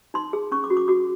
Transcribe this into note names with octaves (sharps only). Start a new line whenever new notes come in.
D#4 C6
G#4
C#4 C#6
D6
F#4
D6
F#4 D6